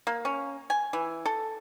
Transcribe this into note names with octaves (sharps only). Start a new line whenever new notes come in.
A#3
C#4
G#5
E3
A4